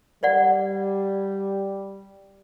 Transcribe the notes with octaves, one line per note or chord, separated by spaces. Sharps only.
G3 C5 D5 F#5